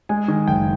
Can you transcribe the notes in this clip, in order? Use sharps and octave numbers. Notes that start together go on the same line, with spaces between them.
G#3 G#5
D#3
F#1 G5